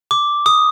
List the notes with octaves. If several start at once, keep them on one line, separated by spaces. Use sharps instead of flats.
D6
D#6